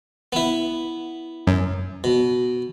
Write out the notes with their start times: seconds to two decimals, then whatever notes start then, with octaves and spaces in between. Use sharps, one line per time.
0.33 B3 E4
1.47 F#2
2.04 B2